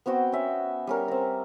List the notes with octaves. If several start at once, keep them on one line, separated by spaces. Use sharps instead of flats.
B3 C4 F#4 G5
C#4 E5
G3 C#4 A#4
C4 A#5